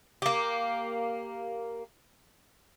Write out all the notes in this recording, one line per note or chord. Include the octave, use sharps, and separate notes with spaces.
A#3 G4